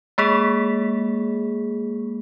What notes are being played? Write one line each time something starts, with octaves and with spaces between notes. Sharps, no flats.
G#3 A#3 G#4